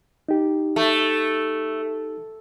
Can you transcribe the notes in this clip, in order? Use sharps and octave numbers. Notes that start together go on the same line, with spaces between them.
D#4 G4
A3